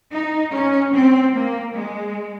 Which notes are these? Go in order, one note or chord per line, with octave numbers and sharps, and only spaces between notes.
D#4
C#4
C4
A#3
G#3